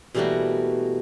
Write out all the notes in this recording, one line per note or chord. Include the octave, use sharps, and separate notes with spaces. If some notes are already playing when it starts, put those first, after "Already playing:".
B2 E3 G3 A3 A#3 F#4